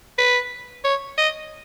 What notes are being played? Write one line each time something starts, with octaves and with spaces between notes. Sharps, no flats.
B4
C#5
D#5